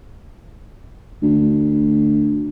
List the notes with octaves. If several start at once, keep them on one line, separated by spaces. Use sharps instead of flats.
D2